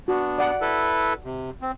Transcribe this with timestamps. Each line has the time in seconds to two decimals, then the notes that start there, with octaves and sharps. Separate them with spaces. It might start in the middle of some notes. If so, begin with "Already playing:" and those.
0.08 B3 D4 F#4
0.38 D5 F#5
0.61 E4 A4 B4
1.24 C3
1.61 C4